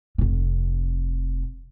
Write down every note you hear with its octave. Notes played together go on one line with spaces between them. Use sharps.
F1 C3